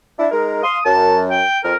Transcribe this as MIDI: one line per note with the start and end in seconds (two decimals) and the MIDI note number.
0.18 0.26 62
0.18 0.26 64
0.31 0.63 56
0.31 0.63 63
0.31 0.63 70
0.63 0.77 77
0.63 0.77 84
0.63 0.83 87
0.85 1.40 42
0.85 1.20 81
1.31 1.59 79
1.64 1.74 41
1.64 1.76 70
1.64 1.74 89